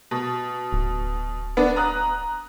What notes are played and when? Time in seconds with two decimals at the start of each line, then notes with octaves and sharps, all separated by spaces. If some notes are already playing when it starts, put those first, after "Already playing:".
0.11 B2
0.73 D1
1.57 B3 D4
1.76 A#5 D#6 F#6